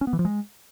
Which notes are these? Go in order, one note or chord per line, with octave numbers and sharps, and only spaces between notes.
C#4
B3
E3
F3
G#3